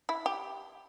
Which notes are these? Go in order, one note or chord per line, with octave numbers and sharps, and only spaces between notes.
E4
G4